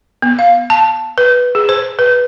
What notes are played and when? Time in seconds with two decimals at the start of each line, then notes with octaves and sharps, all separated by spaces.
0.22 B3
0.39 F5
0.70 A5
1.18 B4
1.55 G#4
1.69 C5
1.99 B4